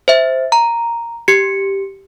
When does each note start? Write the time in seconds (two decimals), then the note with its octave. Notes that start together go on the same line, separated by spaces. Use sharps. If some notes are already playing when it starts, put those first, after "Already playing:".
0.08 C5 E5
0.52 A#5
1.28 G4 C#7